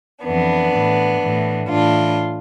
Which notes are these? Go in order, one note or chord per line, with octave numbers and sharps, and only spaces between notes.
F2 E3 B3 D4
A2 E3
A2 E3
A2 E3 D4 F4